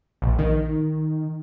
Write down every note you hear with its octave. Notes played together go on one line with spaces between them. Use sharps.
A#1
D#3